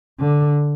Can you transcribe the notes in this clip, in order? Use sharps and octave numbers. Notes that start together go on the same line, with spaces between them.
D3